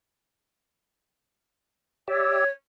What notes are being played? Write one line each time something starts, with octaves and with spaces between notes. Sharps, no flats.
G4 C#5 D5 E5